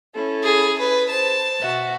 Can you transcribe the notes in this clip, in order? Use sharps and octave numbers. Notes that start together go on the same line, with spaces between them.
C#4 E4 A4
G#4
B4
C5 A5
B2 F#4 E5